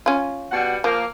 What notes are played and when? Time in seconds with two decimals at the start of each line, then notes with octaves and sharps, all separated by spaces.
0.06 C#4 F4
0.52 B2 G3 F#5
0.84 F3 A#3